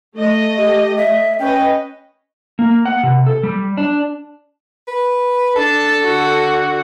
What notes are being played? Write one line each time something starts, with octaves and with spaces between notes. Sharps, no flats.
A3 D#5
G4
E5
C#4 B4 D#5 G5
A#3
F#5
C3
A4
G3
D4
B4
D4 A4 A5
D3 F#4